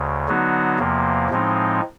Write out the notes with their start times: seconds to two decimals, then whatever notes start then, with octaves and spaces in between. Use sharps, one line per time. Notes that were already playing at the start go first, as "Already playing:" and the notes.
Already playing: D2 C#3
0.28 D3 F#3 B3 D#4 F#4
0.79 E2 C3 F3 A#3
1.30 A2 F3 G#3 C4 D#4